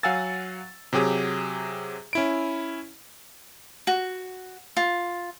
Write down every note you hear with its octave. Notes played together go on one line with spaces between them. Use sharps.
F#3 F5 F#5 G#5 E6 A6
C3 F#3 G4 G#4
C#4 E4 D7
F#4
F4